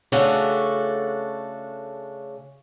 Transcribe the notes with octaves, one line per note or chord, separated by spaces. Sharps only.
C#3 A3 C#4 D4 F#4 A4